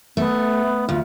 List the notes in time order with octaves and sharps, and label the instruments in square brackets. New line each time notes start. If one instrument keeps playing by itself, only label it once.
[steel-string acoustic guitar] A3 [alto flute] B3
[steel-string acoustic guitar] D2 [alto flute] F4